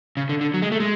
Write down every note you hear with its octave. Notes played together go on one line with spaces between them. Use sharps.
C#3
D3
D3
F#3
G#3
A3
G#3